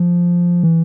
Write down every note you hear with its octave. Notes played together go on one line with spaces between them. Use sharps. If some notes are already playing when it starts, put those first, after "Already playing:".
Already playing: F3
E3